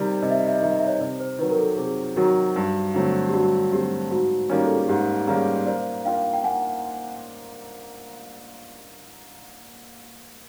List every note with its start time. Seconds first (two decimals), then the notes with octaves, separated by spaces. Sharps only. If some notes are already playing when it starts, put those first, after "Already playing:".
Already playing: C3 D#3 G3
0.22 C3 D#5
0.31 E5
0.39 D#5
0.47 E5
0.54 D#5
0.61 D#3 E5
0.65 G3
0.71 D#5
0.79 E5
0.87 C#5 D#5
1.00 C3 C5 D5
1.20 C5
1.39 D#3 F#3 B4
1.51 A#4
1.58 A4
1.78 C3 G#4
2.16 D#3 F#3 F#4
2.56 G2
2.94 D3 F#3 A3 C4
3.28 G4
3.33 G2 F#4
3.72 D3 F#3 A3 C4 G4
4.11 G#2 F#4
4.50 D#3 G3 A#3 C#4
4.65 A4
4.76 G#4
4.88 G#2 G4
5.27 D#3 G3 A#3 C#4 G#4
5.66 A#3 C5 D5
6.05 D4 F4 A#4 D5 F5 G5
6.33 G5
6.44 A#3 F#5 G#5